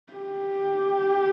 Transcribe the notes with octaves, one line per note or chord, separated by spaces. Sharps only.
G4